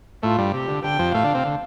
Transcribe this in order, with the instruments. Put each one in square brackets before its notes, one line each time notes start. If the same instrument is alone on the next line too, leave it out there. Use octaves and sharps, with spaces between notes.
[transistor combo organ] A2 A3 [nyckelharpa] F4
[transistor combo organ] G2 G3
[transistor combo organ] C3 [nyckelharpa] G4
[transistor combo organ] D3
[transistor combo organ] D3 [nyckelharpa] G5
[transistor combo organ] F2 F3
[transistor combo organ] A2 A3 [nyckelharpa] F5
[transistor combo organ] D3 D4
C3 C4
D3